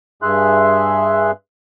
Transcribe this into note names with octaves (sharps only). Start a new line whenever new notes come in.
G2 G#4 E5 C6 F#6